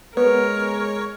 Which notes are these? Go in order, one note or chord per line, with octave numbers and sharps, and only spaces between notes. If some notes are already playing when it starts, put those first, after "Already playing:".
G#3 B3 A#4 C#5